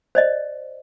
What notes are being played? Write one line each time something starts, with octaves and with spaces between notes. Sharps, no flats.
C5 D5 D#5